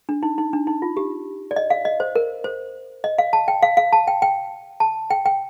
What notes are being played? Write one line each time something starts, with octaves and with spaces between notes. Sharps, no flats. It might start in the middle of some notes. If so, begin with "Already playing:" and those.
D4
D#4
D#4
D4
D#4
F4
G4
D5
D#5
F5
D#5
C5
A#4
C5
D#5
F5
A5
G5
F5
F5
A5
G5
G5
A5
G5
G5